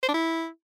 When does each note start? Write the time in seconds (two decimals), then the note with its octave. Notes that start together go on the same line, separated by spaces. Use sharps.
0.03 C5
0.08 D4
0.14 E4